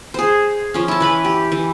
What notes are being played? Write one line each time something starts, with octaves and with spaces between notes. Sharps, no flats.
G#4 C5
F3 C#4
E4 A5
E3 B4 B5
G4
E3